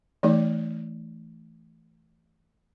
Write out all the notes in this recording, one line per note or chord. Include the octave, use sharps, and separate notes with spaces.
E3 A3 D#4 D5